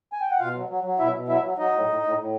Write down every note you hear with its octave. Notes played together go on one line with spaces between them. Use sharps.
G#5
G5
F#5
B2 F4 F5
F#3
F#3
F#3
B2 E4 E5
B2
F#3 E4 E5
F#3
F#3 D#4 D#5
A2
A2
A2
A2